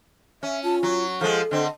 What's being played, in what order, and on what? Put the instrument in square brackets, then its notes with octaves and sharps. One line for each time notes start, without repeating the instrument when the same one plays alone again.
[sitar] C#4 [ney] E5
[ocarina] F4 [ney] A5
[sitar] F#3 [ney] C#6
[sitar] F3 G#3 [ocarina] A4
[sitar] D3 C4 [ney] D#5